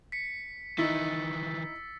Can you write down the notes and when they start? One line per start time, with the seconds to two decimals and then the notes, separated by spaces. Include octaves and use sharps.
0.12 B6 C#7
0.78 D#3 E3 D#4 E4 E6 A6 B6